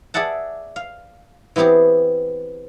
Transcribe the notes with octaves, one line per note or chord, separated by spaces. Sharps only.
G#4 D5 E5 F#5 A5
F5
E3 B3 C4 G4 G#4